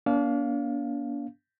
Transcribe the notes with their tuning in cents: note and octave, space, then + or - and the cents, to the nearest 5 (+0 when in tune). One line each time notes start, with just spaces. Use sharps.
A#3 +45 D4 -35 F5 +0